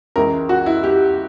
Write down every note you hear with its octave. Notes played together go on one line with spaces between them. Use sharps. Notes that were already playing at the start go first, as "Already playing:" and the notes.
C#2 C#3 E3 A#4
F#4
E4
G4